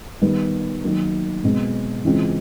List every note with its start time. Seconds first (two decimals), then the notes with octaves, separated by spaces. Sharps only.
0.21 D#3 G3 B3
0.83 D#3 F#3 A#3
1.44 B2 G#3 C4
2.05 C#3 E3 G#3 C4 F4